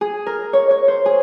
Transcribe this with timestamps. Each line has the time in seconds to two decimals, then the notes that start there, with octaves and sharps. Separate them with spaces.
0.01 G#4
0.26 A#4
0.53 C#5
0.71 C#5
0.88 C5
1.06 G#4